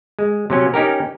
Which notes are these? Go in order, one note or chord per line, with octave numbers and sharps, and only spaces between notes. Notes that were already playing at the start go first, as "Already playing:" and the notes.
G#3
C3 F#3 C#4
C#4 D#4 G4 A#4